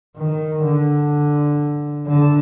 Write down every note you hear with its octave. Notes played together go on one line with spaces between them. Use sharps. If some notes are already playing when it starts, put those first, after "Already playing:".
D#3
D3
D3